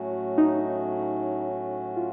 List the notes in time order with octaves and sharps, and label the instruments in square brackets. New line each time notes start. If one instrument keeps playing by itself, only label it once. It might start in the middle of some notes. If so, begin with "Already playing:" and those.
Already playing: [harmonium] A2 F#3 A3 C#4 F#4
[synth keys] D#4
F4